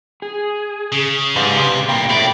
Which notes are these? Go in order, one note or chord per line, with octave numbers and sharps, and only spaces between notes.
G#4
C#3
G#2 G4 B4 F5
C3
A2 A#3 G5
B2 A3 D5